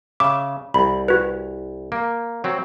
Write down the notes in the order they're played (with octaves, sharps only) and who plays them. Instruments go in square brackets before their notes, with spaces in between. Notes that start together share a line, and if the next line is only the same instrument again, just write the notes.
[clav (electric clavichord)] C#3 E5 [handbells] D6
[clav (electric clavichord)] C2 [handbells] B5
[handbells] F#4 B4
[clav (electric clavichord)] A#3
F#3 C4